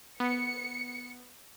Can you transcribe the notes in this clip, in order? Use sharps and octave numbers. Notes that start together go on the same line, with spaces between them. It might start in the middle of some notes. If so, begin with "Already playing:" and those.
B3 C#7